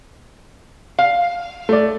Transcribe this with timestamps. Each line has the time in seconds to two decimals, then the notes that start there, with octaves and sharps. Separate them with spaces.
0.99 F5
1.69 A3 D5